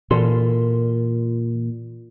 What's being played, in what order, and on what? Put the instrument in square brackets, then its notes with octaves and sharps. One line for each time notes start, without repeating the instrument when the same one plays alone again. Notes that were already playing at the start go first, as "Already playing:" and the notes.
[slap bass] A#2 [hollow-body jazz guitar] E3 A4 C6